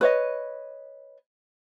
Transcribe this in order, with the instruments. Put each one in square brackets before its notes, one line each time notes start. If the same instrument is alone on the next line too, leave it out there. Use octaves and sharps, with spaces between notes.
[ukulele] B4 C#5 D#5